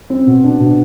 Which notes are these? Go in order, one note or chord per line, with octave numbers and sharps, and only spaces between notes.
C4
B2
D4
B2